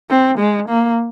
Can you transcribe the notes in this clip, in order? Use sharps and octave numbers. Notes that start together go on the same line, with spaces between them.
C4
G#3
A#3